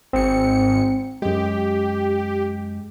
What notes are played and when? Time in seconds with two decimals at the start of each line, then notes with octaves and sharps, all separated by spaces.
0.13 G#1 G#2 C4 C#7
1.22 F#2 G#3 G4